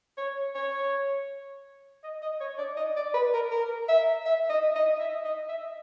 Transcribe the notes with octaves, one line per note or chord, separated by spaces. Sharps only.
C#5
C#5
D#5
D#5
C#5
D5
D#5
D5
B4
A#4
A#4
E5
E5
D#5
D#5
E5
D#5
E5